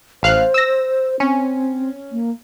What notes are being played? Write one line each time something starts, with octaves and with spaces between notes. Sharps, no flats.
A1 C5 F5 F#6
E6 A#6
C4 C#4
A#3